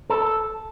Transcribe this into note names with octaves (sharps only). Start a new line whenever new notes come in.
A4